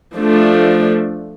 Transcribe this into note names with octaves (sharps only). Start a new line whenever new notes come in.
F3 A3 D4